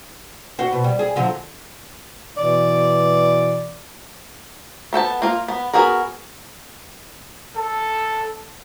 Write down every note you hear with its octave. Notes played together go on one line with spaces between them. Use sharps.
F#4 C5
B2
G3
G#4
D3 F3 F#3
B2 E3 D5
B3 A4 G5 A5
A#3 F4
B3
B3 F#4 G#4 A#4
A4